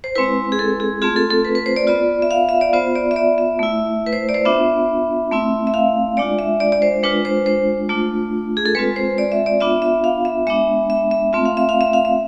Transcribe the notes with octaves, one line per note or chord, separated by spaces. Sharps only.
C5
G#3 C4 E4 B4
G#4
A4
G#4
A3 C4 F4 G#4
A4
A4
B4
B4
C5
D5
B3 F4 D5
E5
F5
E5
D5
B3 F4 C5
D5
E5
D5
E5
A3 E4
B4
C5
D5
C5
B3 D4 F4 E5
A3 C4 E4
E5
F5
G#3 D4 F4 D5
E5
D5
D5
C5
G#3 D4 F4 B4
C5
C5
A3 D4 F4
G#4
A4
G#3 C4 F4 B4
C5
D5
E5
D5
B3 D4 F4 E5
E5
F5
E5
G#3 B3 D4 E5
E5
E5
A3 C4 F4 E5
F5
E5
F5
E5
F5
E5